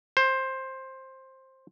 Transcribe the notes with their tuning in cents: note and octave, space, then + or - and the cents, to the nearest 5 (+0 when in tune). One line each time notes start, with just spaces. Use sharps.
C5 +15